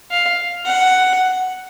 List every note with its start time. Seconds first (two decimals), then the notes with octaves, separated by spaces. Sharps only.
0.11 F5
0.66 F#5